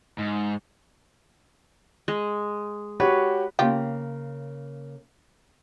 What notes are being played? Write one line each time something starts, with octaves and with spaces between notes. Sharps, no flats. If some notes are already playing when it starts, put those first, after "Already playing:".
G#2
G#3
F#4 G4 B4 C#5
C#3 A#3 F4 G4